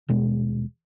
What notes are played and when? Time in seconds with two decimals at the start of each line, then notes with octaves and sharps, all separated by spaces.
0.08 D#1 B2 G#3